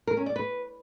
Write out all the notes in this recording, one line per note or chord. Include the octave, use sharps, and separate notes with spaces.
A#4
C#4
D5
B4